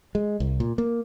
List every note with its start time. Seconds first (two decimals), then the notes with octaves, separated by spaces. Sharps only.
0.15 G#3
0.40 C2
0.60 A#2
0.78 A#3